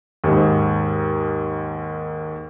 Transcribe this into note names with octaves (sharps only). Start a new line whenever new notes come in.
D#2 G#2